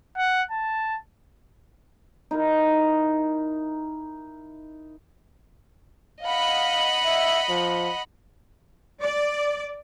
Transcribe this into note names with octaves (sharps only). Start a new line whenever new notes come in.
F#5
A5
D#4 E4 A#4
D#5 F5 F#5 B5
E5
F3
D5